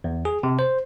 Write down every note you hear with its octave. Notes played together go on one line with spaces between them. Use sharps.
E2
G#4
C3
C5